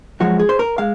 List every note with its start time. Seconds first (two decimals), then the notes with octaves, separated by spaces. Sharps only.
0.20 F#2 F3 G#3 F#4
0.40 G#4
0.49 C5
0.59 A#4
0.78 G#3 F5